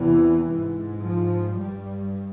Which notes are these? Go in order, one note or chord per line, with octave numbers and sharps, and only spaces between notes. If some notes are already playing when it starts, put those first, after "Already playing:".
Already playing: E2 C3 E3
G#2
F3
G2 G3